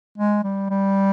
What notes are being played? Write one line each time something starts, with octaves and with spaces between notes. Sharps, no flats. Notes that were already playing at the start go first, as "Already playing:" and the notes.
G#3
G3
G3